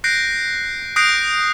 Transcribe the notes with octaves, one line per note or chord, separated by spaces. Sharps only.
F#6 G6 A#6 C7 D7
D#6 F#6 G6 A#6 C7 D7